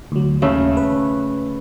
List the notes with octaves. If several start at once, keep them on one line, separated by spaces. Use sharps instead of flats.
D2 F#3
D#2 C#3 A3
B4